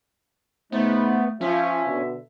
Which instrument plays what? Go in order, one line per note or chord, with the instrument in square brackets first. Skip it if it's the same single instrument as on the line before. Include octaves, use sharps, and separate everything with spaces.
[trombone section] C#3 D#4 C5 [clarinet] A3 [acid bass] B3
[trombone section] F3 [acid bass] C#4 [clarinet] E5
[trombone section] B2 D3